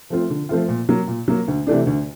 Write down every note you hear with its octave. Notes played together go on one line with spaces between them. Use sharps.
F3 A3 C4 F4
D3
F3 A3 C4 F4
A#2
F#3 A#3
A#2
F#3 A#3
D2
C3 E3 A3 D4
D2